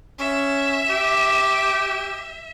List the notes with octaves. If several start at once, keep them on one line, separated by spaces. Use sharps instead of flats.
C#4 E5
G4